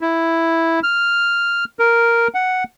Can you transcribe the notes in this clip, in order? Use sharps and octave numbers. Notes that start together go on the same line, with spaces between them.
E4
F6
A#4
F#5